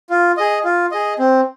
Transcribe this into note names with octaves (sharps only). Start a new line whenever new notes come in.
F4
G#4 D#5
F4
G#4 D#5
C4